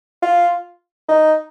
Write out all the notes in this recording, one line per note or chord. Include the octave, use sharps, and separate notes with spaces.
F4
D#4